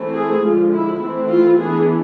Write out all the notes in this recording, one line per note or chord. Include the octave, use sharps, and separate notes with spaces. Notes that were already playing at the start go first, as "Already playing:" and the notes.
Already playing: E3 A3 C4 E4
G#4
D3 F3 G#3 F4
E4
E3 A3 C4 E4
F4
E3 B3 D4 G#4